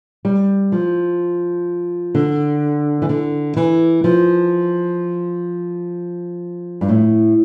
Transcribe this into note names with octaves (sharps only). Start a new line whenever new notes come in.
G3
F3
D3
E3
D3
E3
F3
G2
A2